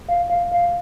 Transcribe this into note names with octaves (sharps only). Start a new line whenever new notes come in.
F5
F5
F5